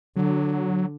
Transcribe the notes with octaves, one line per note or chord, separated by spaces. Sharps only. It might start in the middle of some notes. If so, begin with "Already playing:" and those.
D3 F#3